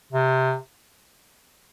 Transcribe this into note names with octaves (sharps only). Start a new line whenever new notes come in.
C3